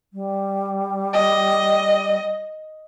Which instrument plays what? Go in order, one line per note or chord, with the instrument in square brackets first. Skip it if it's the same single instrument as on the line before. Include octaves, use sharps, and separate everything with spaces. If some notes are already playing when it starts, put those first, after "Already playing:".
[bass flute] G3
[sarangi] D#5